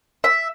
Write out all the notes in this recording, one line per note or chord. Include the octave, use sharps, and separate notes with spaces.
E5